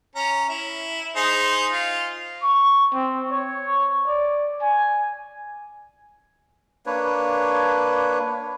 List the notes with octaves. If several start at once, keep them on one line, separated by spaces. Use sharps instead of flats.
C#4 A#5
E4
D#4 G#4 C5
F4
C#6
C4
C#5
D5
G#5
A#3 D4 B4 C#5